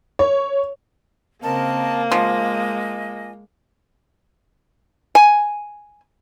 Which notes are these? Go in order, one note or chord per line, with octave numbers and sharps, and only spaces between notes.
C#5
C#3 A#3 C4 A#4 D#5 A5
F3 G#3 D#5 G#5
G#5